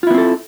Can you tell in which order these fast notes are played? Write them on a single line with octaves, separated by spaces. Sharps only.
F4 E4 B3 C4 A4